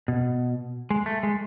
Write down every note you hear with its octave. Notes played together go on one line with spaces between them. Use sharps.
B2
G#3
A3
G#3